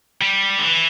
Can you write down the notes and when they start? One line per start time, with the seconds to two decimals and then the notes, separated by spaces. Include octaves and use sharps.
0.21 G3
0.59 D3
0.63 E3